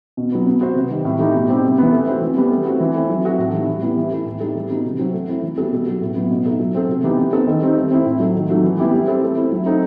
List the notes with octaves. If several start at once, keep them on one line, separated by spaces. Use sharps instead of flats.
B2
F#3 B3
B3
F#4 C5
C3
D#3 G3
A2
E3 A3 D#4 G4
B2
G3 C4 D#4 G4
C3
E3 B3
A3
C4 F#4
E3
G3 B3
A3
C4 F#4
E3
A3 C4 E4
F#3
C4 F#4 A4 E5
A2
E3 G3 D#4
E3
G3 B3 E4
E3
A3 E4
A2
G3 D#4 A4
E3
G3 B3 D#4 F#4
C3
F#3 C4 F#4
A3
C4 E4
E3
G3 B3 F#4 A4
B2
F#3 B3 F#4 A4
A2
F#3 B3
B2
A3 D#4 A4 E5
F#3
A3 C4 F#4 A4
C3
E3 B3 D#4 G4
E3
B3 D#4 A4 C5
D#3
G3 C4 D#4
A3
C4 E4
A2
F#3 A3
D#3
F#3 A3 D#4 F#4
E3
G3 B3 E4 G4
G3
C4 E4 A4
A3
C4 E4
F#3
A3 C4 D#4 A4